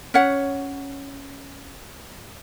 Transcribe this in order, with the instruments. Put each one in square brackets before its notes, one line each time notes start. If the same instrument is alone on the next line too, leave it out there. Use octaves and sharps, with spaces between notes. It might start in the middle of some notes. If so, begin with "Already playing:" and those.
[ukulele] C#4 C#5 F#5